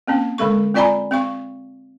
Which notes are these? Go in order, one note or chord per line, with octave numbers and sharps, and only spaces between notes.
A#3 C4 C#4
D3 G#3 A4 C#6
C4 F4 D5 G#5 A#5 B5
C4 F5 C#6